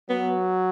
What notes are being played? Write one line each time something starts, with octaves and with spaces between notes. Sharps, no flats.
F#3 B3